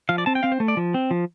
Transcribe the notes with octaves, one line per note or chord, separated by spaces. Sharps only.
F3 F5
D5
C4 A5
G5
C4 F5
C5
A3
D5
F3
C4
F3